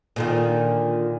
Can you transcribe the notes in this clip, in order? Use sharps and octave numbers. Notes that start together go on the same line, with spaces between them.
A#2 D3 D#3